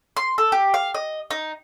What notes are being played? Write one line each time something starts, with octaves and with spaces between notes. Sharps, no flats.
C6
A4
G4
F5
D#5
D#4